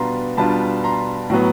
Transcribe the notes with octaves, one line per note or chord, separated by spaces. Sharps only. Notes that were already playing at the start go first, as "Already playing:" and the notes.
Already playing: B2 G3 B3 D4 F4 A#5 C6
B2 G3 B3 D4 F4 A5 B5
A#5 C6
A2 F#3 B3